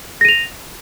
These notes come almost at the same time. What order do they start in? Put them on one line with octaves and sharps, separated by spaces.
A#6 D#7 F7